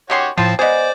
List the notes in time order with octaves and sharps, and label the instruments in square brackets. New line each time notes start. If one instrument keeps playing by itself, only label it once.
[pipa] D#3 C#4 C6 [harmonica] F#4 G4 C#5
[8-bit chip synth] A2 F3 [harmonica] C4 A5 [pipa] F4
[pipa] B3 G#4 [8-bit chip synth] C5 [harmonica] D5 [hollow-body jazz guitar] D#5 G#5